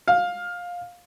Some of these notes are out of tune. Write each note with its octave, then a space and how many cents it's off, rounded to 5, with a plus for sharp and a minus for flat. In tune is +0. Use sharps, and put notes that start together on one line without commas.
F5 +15